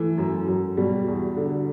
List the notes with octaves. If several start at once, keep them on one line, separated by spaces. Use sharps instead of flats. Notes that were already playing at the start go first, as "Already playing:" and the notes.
Already playing: E3 A3
F#2
F#2
B2 G3
E2
D3